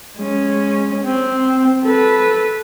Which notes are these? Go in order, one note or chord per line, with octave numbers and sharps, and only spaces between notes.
G#3 C#4
C4
A4 B4